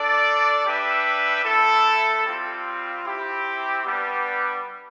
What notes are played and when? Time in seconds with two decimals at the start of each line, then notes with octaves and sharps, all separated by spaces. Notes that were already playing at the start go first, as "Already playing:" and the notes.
Already playing: D4 A4 D5
0.64 G3 D4 G4 B4 E5
1.44 A3 E4 A4
2.24 G3 C4 F4
3.04 C4 E4 G4
3.85 G3 B3 D4 G4 B4